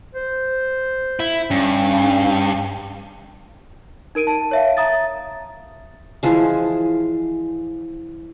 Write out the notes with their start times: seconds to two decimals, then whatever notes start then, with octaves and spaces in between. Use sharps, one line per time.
0.15 C5
1.20 E4
1.51 G2 C#4
4.15 D#4 A#4 D7 D#7
4.27 A5
4.51 C#5 E5 F5
4.77 E5 A#5 D#6 A6
6.23 E3 F3 G#3